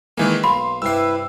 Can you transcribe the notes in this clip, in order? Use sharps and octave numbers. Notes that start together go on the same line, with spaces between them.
D#3 E3 G#3 A#3 D#4 A4
B1 A#3 B5 C6
G2 C3 E4 B4 D5 E6 C7